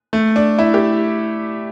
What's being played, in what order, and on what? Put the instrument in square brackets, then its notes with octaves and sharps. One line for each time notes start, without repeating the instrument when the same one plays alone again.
[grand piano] A3
D4
E4
G4